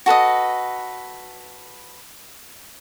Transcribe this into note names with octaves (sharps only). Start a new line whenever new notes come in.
F#4 A4 B4 D#5